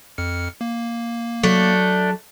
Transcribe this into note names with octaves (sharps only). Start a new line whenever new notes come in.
F2 F6 C#7
A#3
F#3 A3 D4